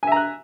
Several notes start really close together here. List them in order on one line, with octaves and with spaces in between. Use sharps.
G#5 E5 A#5 F#6